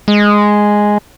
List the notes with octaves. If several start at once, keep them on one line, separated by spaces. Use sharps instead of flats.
G#3